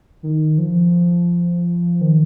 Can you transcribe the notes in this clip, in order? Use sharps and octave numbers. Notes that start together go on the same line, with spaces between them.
D#3
F3
D#3